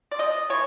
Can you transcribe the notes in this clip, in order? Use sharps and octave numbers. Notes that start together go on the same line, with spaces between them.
D5
C3 D#5
E3 C#5